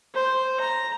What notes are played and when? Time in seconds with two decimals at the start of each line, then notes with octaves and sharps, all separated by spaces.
0.15 C5
0.60 A#5